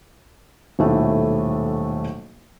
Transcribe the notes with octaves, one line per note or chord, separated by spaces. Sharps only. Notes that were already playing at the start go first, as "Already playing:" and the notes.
D#1 B1 A2 A3 E4